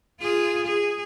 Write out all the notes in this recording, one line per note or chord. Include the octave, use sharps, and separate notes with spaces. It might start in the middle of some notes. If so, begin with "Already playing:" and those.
F4 G#4
G#4